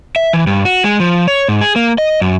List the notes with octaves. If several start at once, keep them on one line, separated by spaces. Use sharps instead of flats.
E5
E3
G2
F#4
G#3
F3
C#5
G#2
G#4
A#3
D#5
F#2